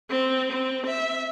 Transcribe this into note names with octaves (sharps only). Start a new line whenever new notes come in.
C4
C4
E5